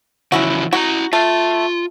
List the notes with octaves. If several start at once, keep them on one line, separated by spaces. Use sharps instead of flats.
C#3 E3 F3 C#4 E4 F#4
E4 F#4 G#5 A#5
A3 F4